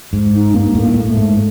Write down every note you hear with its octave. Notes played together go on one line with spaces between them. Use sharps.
G#2
D#4
G2 A#3
A2
A#3
A2 A#3
A3
G#2